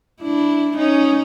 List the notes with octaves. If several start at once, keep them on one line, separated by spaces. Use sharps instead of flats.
D4 E4
C#4 D#4